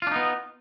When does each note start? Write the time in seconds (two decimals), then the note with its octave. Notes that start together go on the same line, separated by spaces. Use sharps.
0.02 F4
0.07 D4
0.11 D#4
0.16 B3